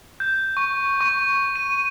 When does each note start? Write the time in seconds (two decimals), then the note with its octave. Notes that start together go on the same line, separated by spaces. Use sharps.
0.20 G6
0.57 C#6
1.01 C#6
1.56 D#7